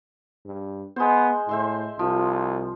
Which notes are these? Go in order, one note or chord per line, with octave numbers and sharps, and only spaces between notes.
G2
G#3 B3 C5
A2 C5 E5 C6
C2 F3